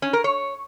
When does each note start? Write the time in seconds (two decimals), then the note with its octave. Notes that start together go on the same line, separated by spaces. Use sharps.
0.02 C#4
0.13 A#4
0.24 C#5